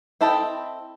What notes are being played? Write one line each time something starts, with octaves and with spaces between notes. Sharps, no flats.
C4 E4 A4 D#5 G5